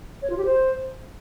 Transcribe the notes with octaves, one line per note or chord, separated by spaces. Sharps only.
C#5
F4
G4
C5